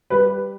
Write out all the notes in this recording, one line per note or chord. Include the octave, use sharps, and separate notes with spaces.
G3 B4